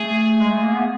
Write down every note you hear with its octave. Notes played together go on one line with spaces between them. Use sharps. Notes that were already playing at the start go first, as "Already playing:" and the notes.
Already playing: A3 G#4
G#3
A3
A#3
B3